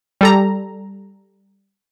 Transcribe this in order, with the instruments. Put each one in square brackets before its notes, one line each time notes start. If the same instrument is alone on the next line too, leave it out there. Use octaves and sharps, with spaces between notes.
[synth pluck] G3 A4 A#5